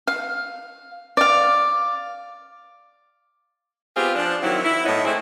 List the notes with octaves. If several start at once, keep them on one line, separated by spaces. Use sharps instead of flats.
F5
D5 F5
B3 C4 F4 G4 G#4
F3 D4
D#3 F#3 C4 E4
E4
A2 B3 D#4 C#5 D#5
A3 C4 D4 E4 G#4